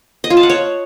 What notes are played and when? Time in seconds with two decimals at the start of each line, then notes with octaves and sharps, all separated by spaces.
0.24 D#5
0.30 F4
0.37 A5
0.43 F#5
0.50 C#5